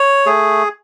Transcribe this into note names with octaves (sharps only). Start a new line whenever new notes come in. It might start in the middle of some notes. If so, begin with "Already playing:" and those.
Already playing: C#5
A3 G#4